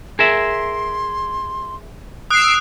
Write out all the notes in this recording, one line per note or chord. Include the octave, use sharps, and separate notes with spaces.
G#4 A#4 E5 C6
D#6 E6 F#6 C7 D7